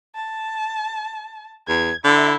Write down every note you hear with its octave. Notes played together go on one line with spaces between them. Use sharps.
A5
E2 G#6
D3 E4